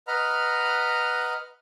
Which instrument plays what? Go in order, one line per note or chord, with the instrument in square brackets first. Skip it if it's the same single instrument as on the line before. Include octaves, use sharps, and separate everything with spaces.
[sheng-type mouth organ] B4 D#5 F#5 A#5 B5 F6